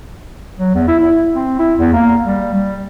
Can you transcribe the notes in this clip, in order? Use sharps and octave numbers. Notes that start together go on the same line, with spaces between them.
F#3
E2
E4
E4
C4
E4
E2
A#3
G3
G3